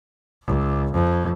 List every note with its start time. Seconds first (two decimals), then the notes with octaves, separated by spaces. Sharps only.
0.43 C#2
0.92 F2